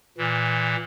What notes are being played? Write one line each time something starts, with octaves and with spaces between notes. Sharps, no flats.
A#2 E3